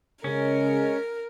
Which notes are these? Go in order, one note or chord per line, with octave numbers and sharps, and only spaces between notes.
C#3 G#3 C#4 A#4